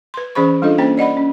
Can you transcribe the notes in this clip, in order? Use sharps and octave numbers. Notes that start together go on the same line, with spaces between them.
B4 C6
E3 C#4 G#4 C5 B5 C#6
G3 D4 F4 A4 D#5
A#3 C#4 C5 G5 A#5
D5 D#5 F#5 B5
C#4